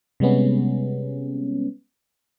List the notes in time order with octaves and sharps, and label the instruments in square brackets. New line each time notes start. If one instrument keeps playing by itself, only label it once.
[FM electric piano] C3 G3 G#3 B3 C#4